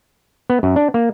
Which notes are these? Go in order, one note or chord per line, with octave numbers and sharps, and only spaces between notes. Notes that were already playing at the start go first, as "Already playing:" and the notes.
B3
F#2
D4
A#3